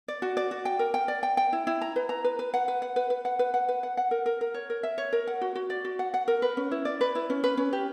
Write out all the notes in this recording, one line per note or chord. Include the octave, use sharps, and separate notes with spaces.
D5
F#4
D5
F#4
G5
A#4
G5
D5
G5
G5
E4
E4
A#5
B4
A#5
B4
B4
F#5
B4
F#5
B4
B4
F#5
B4
F#5
B4
F#5
F#5
A#4
A#4
A#4
C#5
A#4
E5
C#5
A#4
F#5
F#4
F#4
D5
F#4
F#5
F#5
A#4
B4
C#4
E4
D5
B4
E4
C#4
B4
C#4
G4